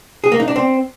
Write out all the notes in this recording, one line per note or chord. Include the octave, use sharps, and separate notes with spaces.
G#4
A#3
D#4
D4
C4